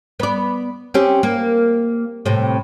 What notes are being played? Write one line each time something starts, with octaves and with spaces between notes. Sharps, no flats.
B3 D5
C4 C#4 G4
A#3
A2 C3